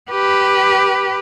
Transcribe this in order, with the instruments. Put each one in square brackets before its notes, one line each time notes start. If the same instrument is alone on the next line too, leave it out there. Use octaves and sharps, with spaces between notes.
[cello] G4 B4